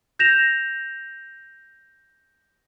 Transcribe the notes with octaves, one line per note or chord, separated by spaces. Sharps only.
G6 A#6 E7 F7